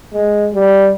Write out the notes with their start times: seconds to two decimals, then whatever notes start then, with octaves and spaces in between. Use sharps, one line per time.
0.13 G#3
0.54 G3